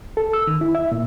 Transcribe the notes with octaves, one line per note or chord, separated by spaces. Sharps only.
A4
E6
D#3
E4
E5
A#2